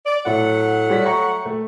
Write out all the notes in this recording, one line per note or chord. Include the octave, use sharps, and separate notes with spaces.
D5
A2 F#3 A3 F#5
G3 C#5 B6
G5 A#5 C#6
A3